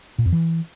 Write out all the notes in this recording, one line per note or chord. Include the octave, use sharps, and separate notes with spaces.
A#2
F2
E3